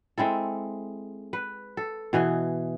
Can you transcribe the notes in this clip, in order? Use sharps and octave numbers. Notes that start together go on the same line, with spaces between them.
G#3 C4 E4 A4
B4
A4
B2 E3 G#4 D#5